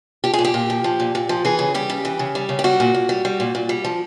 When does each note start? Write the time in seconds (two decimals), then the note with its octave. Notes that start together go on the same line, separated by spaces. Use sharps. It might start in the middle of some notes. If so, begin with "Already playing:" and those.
0.24 F3 G4
0.34 G#4
0.39 A#2
0.45 G4
0.54 A#2
0.70 F3
0.84 F3
1.00 A#2
1.15 A#2
1.29 F3
1.45 E3 G#4
1.59 C#3
1.74 G3 G4
1.90 C#3
2.05 E3
2.19 C#3
2.35 G3
2.49 C#3
2.59 G4
2.64 G3 F#4
2.80 A#2
2.94 A#2
3.09 G3
3.25 G3
3.40 A#2
3.55 A#2
3.69 G3
3.85 F3